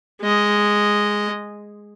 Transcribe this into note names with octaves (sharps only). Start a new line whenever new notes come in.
G#3 D#5